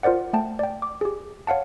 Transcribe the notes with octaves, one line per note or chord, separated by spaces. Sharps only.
F4 A#4 C5 D5 F#5
A3 G5 A5
D5 G5
D6
G4 G#4
C#5 F5 F#5 A5